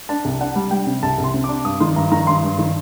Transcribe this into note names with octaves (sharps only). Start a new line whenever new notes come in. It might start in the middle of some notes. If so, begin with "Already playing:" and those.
D4 A5
C2
D4 F#5
G3
G3 G5
C3
C2 A5
C2
C6
C3
D6
D4
G2 D#6
D#3 C6
G2 A#5
D#3 A#5
G2 C6
G2
D#3